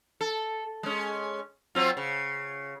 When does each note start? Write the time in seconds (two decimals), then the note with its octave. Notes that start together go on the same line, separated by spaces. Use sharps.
0.21 A4
0.83 G#3 C#4
1.75 F#3 C4 F4
1.97 C#3